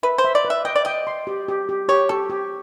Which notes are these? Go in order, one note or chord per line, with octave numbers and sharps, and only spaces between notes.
B4 E5
C5
E5
D5
B4
E5
D#5 G5
D5
D#5 G5
C6
G4
G4
G4
G4 C#5
G4 A4
G4